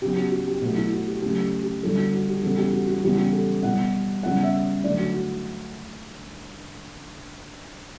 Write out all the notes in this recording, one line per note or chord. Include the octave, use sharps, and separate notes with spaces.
C#3 F#3 B3 G4
F#4
F#4
G4
B2 F#3 A3 F#4
E4
F#4
G4
C#3 F#3 A3 G4
G4
D3 G3 B3 A4
F#4
F#4
G4
C#3 E3 G3 B3 A4
G4
F#4
F#4
C#3 E3 G3 B3 G4
G4
A4
B2 G3 B3 F#5
C#3 G3 B3 F#5
E5
D3 F#3 A3 D5
F#4
F#4